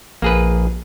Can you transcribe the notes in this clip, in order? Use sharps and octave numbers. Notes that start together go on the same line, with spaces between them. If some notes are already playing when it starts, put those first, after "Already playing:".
A#1 A#3 G#4 B4